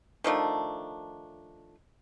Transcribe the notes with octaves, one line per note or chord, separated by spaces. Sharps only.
D#3 F3 A3 D4